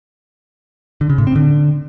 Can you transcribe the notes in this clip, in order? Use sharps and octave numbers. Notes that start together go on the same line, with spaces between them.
D3
C#3
A2
C4
D3